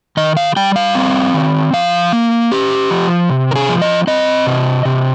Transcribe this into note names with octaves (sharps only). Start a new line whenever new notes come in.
D#3 D#5
F5
G3 G5
F5
C4
D#3
F3 F5
A#3
C#4 G4
F3
C3
A#4
G#4
F3
D#5
C4 D#5
C3
C3